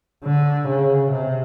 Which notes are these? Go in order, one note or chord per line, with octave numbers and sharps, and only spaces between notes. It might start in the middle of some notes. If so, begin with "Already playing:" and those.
D3
C#3
C3